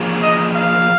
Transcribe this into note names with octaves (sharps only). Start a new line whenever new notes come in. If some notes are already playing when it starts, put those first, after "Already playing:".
Already playing: F3 A#3 F4 G#4
D#5
F5